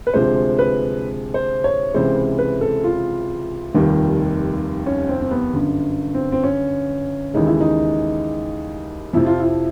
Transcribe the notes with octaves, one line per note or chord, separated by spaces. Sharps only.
B4
D2 C3 F3 G#3 C5
B4
C5
C#5
C#2 C3 E3 G#3 C5
B4
A4
F4
F1 D#2 D#3 G3
C#4
C4
C4
B3
G1 F#2 D3
C4
C4
C#4
D#2 C#3 E3 G#3 D#4
E4
D#4
F2 C3 F3 E4
F4
E4